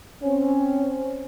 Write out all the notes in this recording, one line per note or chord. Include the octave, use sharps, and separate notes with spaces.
C4 C#4